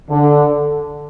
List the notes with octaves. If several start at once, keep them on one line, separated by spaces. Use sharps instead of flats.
D3